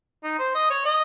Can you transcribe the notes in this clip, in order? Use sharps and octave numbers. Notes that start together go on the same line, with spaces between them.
D#4
C5
D#5
C#5
D#5